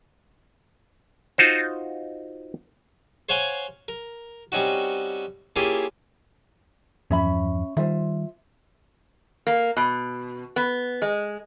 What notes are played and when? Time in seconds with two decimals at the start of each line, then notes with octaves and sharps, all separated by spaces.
1.38 D#4 F4 F#4 C5
3.29 C5 C#5 F5 F#5 G#5 C6
3.88 A#4
4.52 G3 C4 C#4 D#4 F#4
5.56 A#3 C#4 E4 F4 G4 G#4
7.11 E2 G2 F3 C#4 E5 B5
7.77 D#3 G3 F4 C5 E5
9.47 A#3
9.77 B2
10.56 B3
11.02 G#3